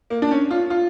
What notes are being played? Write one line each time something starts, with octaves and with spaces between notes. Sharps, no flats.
A#3
D4
C#4
F4
F4